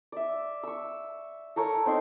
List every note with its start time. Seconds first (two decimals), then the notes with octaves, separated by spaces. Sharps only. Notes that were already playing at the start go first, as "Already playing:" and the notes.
0.12 D5 E5
0.63 C#6 E6
1.56 A4 A#4 C#5 A#5
1.86 C4 D#4 C6 C#6